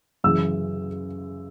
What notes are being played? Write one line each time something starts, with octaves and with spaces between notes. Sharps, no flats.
F#2 C#3 E3 E6